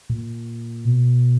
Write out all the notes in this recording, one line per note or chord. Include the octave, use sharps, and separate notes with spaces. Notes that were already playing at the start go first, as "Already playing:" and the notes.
A#2
B2